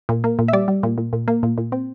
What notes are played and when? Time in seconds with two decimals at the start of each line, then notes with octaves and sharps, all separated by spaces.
0.09 A#2
0.24 A#3
0.39 A#2
0.48 E5
0.53 G3 D5
0.68 G3
0.83 A#2
0.98 A#2
1.13 A#2
1.28 A#3
1.43 A#2
1.58 A#2
1.72 C4